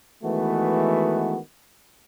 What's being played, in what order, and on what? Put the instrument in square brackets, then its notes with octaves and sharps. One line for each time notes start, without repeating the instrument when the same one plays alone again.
[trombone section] D#3 E3 G#3 A3 B3 F#4